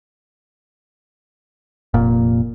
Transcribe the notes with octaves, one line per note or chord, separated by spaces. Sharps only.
F1 A#2